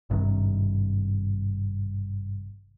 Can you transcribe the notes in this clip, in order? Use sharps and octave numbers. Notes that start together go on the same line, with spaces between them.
G#1 G2 C3 D#3